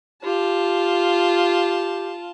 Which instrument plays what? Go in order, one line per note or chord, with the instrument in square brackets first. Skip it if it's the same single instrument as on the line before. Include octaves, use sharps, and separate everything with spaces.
[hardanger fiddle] F4 A5 [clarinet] G4